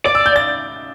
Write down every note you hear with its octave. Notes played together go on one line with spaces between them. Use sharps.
D5 D6
E6
G6
A6